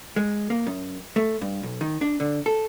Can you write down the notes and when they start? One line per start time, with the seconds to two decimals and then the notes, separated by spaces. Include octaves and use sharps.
0.16 G#3
0.50 A#3
0.66 F#2
1.16 A3
1.41 G2
1.63 B1
1.81 D#3
2.01 D4
2.20 D3
2.46 A4